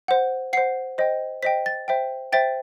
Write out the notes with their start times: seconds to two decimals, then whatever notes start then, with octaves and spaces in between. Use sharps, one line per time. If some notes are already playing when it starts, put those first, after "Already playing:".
0.08 C5 F#5
0.53 C5 F#5 C7
0.98 C5 D#5 G5
1.43 C5 D#5 G5 B6
1.66 A6
1.88 C5 E5 G5
2.32 C5 E5 G5 A6